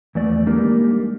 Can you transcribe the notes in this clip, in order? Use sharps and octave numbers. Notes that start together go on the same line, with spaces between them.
E2 A3 D5
G3 G#3 A#3 D4 D#4